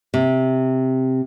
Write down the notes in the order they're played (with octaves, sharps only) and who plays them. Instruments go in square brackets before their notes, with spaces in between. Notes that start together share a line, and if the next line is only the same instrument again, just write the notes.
[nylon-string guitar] C3